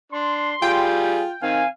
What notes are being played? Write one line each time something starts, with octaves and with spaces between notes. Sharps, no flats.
D4 C6
G3 F4 G#4 G5
D#3 C4 F5 G#5